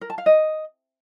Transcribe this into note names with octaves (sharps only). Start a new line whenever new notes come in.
A#4
A5
F5
D#5